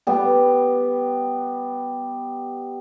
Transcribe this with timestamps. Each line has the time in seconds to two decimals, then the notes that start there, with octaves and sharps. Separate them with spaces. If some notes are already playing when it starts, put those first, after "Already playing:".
0.07 G3 B3